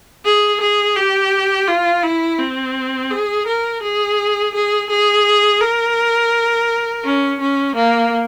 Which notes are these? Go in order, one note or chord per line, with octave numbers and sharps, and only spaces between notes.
G#4
G#4
G4
F4
E4
C4
G#4
A#4
G#4
G#4
G#4
A#4
C#4
C#4
A#3